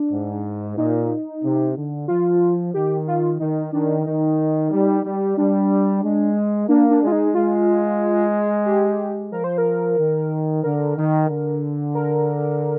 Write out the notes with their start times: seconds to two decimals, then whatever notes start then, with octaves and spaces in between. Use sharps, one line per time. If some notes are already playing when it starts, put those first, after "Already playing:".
Already playing: D4
0.11 G#2
0.77 A#2 D#4
1.43 C3
1.75 D3
2.08 F3 F4
2.74 D#3 G4
3.08 F4
3.40 D#3 D#4
3.72 D#3 D4
4.06 D#3 D#4
4.71 G3
5.04 G3
5.37 G3 D4
6.03 G#3
6.68 A#3 D4
6.91 D4
7.02 G#3
7.07 F4
7.12 D#4
7.34 G#3 F4
8.66 G4
9.32 F3 A#4
9.44 C5
9.58 A#4
9.98 D#3
10.63 D3 A#4
10.96 D#3
11.29 D3
11.95 A#4